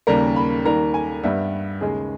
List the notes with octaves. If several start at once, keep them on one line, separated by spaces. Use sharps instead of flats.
D#2 C#3 G3 A#3 A#5
B5
D#2 D#3 G3 A#3 A#5
G#5
G2 G3 B3 E5
D#2 C#3 G#3 G#4